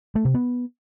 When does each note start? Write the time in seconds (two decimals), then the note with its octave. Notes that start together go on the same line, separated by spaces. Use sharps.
0.15 A3
0.25 C3
0.34 B3